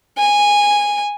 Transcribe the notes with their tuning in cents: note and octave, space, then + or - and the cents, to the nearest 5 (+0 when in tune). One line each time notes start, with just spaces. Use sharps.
G#5 -10